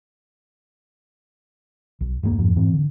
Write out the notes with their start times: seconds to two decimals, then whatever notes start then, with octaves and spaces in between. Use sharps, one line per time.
2.01 B1
2.23 D#1 G2 F#3 A#3
2.38 F2 G#2 F3
2.56 G#2 E3 C4
2.73 D3